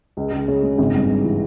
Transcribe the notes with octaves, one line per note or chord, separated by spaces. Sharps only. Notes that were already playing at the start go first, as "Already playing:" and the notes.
C#2
C#2
C#3
G#3
G#1
G2
G2
E3